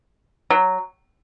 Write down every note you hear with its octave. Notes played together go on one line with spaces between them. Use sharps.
F#3